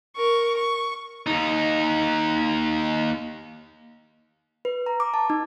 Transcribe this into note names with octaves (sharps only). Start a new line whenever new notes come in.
A#4 C#6
C#6
D#2 D#4
B4
A#5
D6
A5
D#4